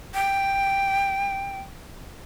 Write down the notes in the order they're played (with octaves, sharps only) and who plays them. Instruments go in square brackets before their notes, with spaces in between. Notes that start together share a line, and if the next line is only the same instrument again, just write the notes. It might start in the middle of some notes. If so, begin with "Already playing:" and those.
[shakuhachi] G5